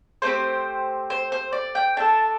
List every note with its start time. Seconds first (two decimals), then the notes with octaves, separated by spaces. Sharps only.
0.22 A3 C4 G4 C5
1.10 C5
1.32 C5
1.53 D5
1.75 G5
1.97 D4 A4 A5